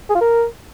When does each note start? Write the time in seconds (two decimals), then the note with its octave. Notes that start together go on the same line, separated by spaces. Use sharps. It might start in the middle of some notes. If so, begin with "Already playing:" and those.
0.10 G#4
0.15 F4
0.21 A#4